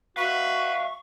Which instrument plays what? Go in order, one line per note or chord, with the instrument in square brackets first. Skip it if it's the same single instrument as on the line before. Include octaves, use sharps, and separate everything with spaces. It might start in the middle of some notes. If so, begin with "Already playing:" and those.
[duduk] F#4 [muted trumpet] B4 [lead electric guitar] E5 F5 [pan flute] C#6